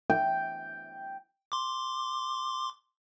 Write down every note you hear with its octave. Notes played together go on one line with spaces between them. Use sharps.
G5
C6 D6